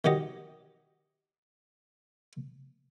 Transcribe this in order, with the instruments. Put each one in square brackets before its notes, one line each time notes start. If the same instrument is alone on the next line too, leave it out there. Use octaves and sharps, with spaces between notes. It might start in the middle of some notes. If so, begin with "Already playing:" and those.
[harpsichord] D#3 F#3 G4 D#5